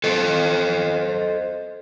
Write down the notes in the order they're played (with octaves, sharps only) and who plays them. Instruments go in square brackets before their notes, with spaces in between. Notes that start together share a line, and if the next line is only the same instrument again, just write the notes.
[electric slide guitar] A4 C5 D#5